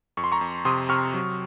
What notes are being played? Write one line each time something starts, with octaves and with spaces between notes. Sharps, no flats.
F2 C#6
C6
A#5 C#6
F2
C3 C6 D#6
C3 C#6 F6
F#3